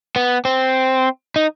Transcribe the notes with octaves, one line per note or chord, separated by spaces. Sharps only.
B3
C4
D#4